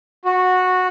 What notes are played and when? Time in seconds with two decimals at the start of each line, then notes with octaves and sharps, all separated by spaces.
0.25 F#4